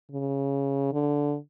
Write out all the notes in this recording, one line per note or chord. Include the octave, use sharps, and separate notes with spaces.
C#3
D3